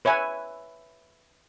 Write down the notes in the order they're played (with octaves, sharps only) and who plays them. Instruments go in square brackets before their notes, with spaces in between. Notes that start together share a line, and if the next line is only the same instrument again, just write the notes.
[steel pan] B4 C#5 E5 G#5